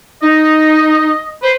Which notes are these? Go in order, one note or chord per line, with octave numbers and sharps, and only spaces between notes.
D#4 D#5
B4 C5